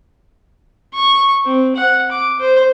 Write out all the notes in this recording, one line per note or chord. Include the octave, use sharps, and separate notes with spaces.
C#6
C4
F#5
D6
C5